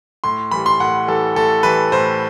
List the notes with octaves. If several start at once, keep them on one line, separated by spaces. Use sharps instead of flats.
A2 C6
E3 G3 B5
C6
A2 F#5
E3 G3 A4
A2 A4
E3 G3 B4
A2 C5